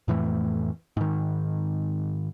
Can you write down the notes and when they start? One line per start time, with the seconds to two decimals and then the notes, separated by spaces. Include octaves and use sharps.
0.08 F2 A2 E3 A3
0.97 G#2 D#3